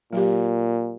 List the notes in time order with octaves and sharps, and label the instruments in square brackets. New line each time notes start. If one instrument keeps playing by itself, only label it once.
[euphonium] A#2 [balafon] F#3 G4